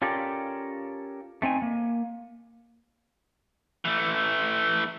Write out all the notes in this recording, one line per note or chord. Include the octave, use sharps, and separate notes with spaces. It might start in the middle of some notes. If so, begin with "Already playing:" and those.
C#4 F4 G4 A4 A#4 D5
A3 C4 D#4 G#5
A#3
E3 A3